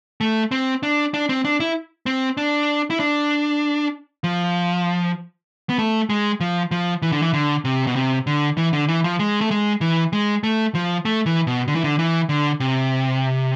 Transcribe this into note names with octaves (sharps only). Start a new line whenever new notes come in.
A3
C4
D4
D4
C4
D4
E4
C4
D4
E4
D4
F3
B3
A3
G#3
F3
F3
E3
D3
E3
D3
C3
B2
C3
D3
E3
D3
E3
F3
G#3
A3
G#3
E3
G#3
A3
F3
A3
E3
B2
D3
E3
D3
E3
D3
C3